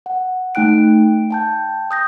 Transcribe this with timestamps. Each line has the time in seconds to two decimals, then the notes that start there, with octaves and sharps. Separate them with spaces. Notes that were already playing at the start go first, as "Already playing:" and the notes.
0.06 F#5
0.55 A3 D#4 G5 F#6 D7
1.30 G5 A5 G6
1.91 D#6 G6 A#6